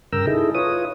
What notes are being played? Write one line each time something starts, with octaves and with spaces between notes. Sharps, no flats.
G2 C#3 A#4 G5 A#5 E6
D#4 E4 G#4 A4
F4 B4 C#5 D#6